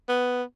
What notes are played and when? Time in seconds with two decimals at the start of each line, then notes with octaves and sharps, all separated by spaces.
0.09 B3